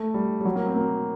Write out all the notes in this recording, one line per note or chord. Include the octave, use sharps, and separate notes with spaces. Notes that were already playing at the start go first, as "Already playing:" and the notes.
Already playing: A3
G3
G3
F#3
A#3
C4
A#3